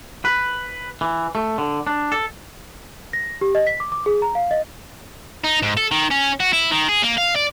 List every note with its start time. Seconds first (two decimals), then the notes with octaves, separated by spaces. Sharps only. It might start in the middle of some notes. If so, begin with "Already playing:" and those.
0.25 B4
1.01 E3
1.35 A3
1.58 D3
1.87 D4
2.12 A4
3.13 A#6
3.41 G4
3.55 D#5
3.67 B6
3.80 D6
3.92 D6
4.06 G#4
4.22 A#5
4.35 F5
4.51 D#5
5.44 D#4
5.63 G#2
5.77 A4
5.91 D#3
6.10 C#4
6.40 F#4
6.53 E4
6.72 D#3
6.89 G#4
7.03 A#3
7.18 F5
7.36 D5